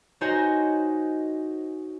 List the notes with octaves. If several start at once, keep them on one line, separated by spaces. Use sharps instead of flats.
D#4 F#4 C5 C#5 D#5 G#5